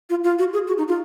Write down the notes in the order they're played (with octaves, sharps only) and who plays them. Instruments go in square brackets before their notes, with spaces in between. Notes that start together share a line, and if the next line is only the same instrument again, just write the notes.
[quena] F4
F4
F#4
G#4
F#4
D#4
F4